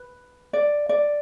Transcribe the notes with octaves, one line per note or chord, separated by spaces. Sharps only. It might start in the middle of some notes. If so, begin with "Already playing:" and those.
Already playing: B4
D5
D5